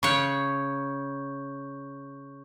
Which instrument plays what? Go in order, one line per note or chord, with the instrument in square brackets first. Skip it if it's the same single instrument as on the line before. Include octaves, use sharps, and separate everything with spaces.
[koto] C#3 C#5 [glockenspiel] C#6 F#6 G6